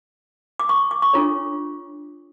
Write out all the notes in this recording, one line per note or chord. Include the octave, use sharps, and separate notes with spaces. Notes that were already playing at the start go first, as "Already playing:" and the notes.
D6
C#6
D6
C#6
D4 F4 A4 C#5